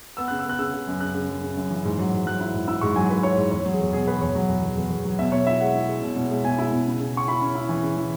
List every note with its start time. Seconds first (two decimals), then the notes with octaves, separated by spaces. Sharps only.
0.17 B3 E6
0.28 C#3 F#6
0.39 E6
0.46 B3 F#6
0.59 C#3 E6
0.74 C#3
0.88 F#2
1.00 C#3 F#6
1.14 C#3
1.29 F#2
1.43 C#3
1.57 F#2
1.71 E3
1.85 G#2
1.98 F#3
2.13 G#2
2.26 F#3 F#6
2.41 E4
2.54 G#2
2.68 E4 E6
2.81 G#2 C#6
2.96 F#3 G#5
3.10 F#3 B4
3.23 E4 C#5
3.37 G#2
3.51 E2 C#5
3.66 F#3
3.73 G#4
3.80 E2
3.93 B2 G#4
4.07 E2 B4
4.21 E2 C#5
4.35 F#3
4.49 E2
4.63 E2
4.77 E2
4.90 E2
5.05 F#3
5.19 B2 E5
5.32 B2 C#5
5.47 E4 E5
5.60 G#3 F#5
5.75 E4
5.89 G#3
6.02 B2
6.17 B2
6.31 G#3
6.44 B2 G#5
6.58 E4
6.71 B2
6.86 C#3
7.00 C#3
7.14 C#4 C#6
7.28 E4 B5
7.41 C#4
7.55 E4
7.69 E3
7.83 C#3
7.97 E3